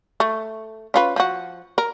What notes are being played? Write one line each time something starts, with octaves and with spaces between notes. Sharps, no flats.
A3
C#4 F4 B4
F3 F#4
A#4